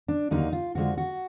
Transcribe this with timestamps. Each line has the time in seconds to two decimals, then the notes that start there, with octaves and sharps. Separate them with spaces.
0.08 D4
0.31 D#2 D3 F#3 A#3 D#4
0.53 F4
0.75 F2 D3 F3 G#3 F#4
0.98 F#4